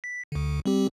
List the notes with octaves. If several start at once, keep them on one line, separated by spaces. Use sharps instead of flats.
B6
D2 D3
G3 C4 G4